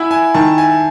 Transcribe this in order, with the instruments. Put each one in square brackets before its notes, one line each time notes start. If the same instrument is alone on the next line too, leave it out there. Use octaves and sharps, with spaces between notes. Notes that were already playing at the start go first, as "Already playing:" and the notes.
Already playing: [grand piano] E4 [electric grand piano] E5 F#5 G#5
[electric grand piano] G#5
[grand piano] D#3 [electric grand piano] A5
[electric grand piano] G#5